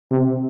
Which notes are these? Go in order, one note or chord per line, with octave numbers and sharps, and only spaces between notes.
C3